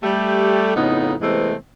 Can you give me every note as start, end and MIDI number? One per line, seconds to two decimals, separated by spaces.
0.03 0.74 55
0.03 0.74 57
0.03 0.74 67
0.75 1.14 41
0.75 1.14 45
0.75 1.14 49
0.75 1.14 59
0.75 1.14 63
1.20 1.53 48
1.20 1.53 52
1.20 1.53 56
1.20 1.53 57
1.20 1.53 59
1.20 1.53 60